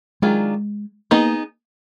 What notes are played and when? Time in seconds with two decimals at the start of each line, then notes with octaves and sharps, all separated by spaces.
0.22 D#3 F#3 G#3 D4 F4 G#4
1.11 A#3 B3 D#4 G#4 D#5